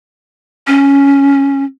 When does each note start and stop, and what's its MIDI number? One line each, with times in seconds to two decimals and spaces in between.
0.67 1.65 61